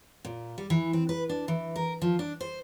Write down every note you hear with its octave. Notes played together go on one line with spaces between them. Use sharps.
A#2
G3
E3
C4
B4
D4
E3
A#4
F3
D4
C5